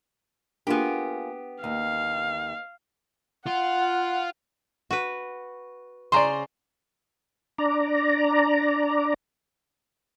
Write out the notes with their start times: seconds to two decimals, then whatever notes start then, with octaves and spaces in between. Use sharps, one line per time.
0.67 A#3 B3 D4 F4 G4 G#4
1.64 D#2 F5
3.46 F4 F#5
4.91 F#4 B4
6.12 C#3 C5 D5 A#5 C6
7.58 D4 D5 A#5